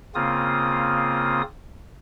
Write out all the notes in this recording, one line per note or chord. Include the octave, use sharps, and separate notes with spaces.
C#3 A#3 C4 F4 D#6